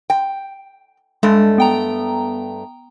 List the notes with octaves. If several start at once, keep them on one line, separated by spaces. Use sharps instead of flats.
G5
G2 G#3 A3
B3 G5 A#5